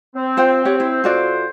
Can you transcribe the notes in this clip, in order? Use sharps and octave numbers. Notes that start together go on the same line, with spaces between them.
C4
F4 C5 G5
G4 C#5 F#5
E4
C3 F4 F#4 A4 C5 D5